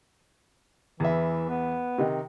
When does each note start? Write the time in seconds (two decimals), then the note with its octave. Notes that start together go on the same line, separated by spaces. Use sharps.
1.00 E2 E3 E5
1.49 B3
1.98 C3 D#3 D#4